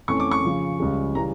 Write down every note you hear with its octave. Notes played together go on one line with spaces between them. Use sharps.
F2 E3 A3 C#4 C#6
D6
C#6
C#3 F3 C#4
C#2 C#3 G3 C#4
C#3 E3 G3 A#5